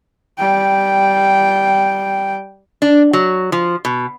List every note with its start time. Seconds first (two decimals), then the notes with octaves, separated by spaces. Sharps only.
0.38 G3 G5
2.82 D4
3.13 F#3
3.52 F3
3.85 B2